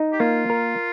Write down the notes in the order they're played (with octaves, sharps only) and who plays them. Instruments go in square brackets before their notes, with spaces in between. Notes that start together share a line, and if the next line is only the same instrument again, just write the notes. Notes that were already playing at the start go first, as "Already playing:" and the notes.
Already playing: [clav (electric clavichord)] D#4
[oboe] G4
[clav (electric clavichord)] A#3 [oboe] F4
[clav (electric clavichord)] A#4